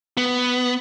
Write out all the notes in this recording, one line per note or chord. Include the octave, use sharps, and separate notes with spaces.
B3